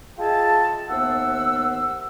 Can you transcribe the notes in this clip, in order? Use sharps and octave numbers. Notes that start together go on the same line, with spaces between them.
F4 G#4 D#5 E5 G5 A5
D#2 B3 C5 E5 F#5 E6